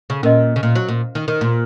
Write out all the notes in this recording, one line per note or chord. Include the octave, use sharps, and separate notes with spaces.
C#3
A#2 C#4 A#4 D#5
C#3
A#2
F#3
A#2
D#3
D#3
A#2